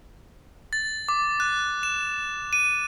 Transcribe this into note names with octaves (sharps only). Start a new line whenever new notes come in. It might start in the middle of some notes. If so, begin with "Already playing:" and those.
A6
D6
F#6
E7
D#7